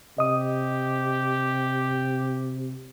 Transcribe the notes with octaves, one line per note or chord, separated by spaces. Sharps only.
C3 G4 D#5 D#6